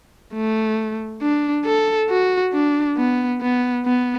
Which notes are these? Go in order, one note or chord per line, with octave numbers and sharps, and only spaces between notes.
A3
D4
A4
F#4
D4
B3
B3
B3